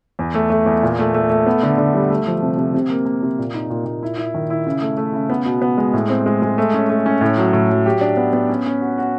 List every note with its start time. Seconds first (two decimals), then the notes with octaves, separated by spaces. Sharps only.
0.19 E2
0.34 A3
0.50 A3
0.66 E2
0.83 A#2
0.99 A3
1.14 A3
1.30 A3
1.46 B3
1.63 D3
1.78 D3
1.94 G3
2.10 A3
2.27 F3
2.42 C3
2.58 C3
2.74 C3
2.90 A#3
3.06 A#3
3.23 C3
3.38 A#2
3.54 D#4
3.70 A#2
3.85 A#2
4.03 E4
4.17 E4
4.34 D#3
4.50 E4
4.67 C#3
4.82 A3
4.97 A3
5.13 C#3
5.30 B3
5.45 B2
5.62 B3
5.78 G#3
5.93 A2
6.09 C4
6.26 G#3
6.42 G#3
6.58 A3
6.74 C#4
6.89 A3
7.06 C#4
7.21 A2
7.37 F#3
7.53 A2
7.70 F#3
7.86 G4
8.01 D4
8.17 B3
8.33 B3
8.49 C#4
8.66 C#4
8.81 F#4
8.98 F#4